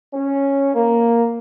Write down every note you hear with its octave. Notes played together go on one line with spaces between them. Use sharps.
C#4
A#3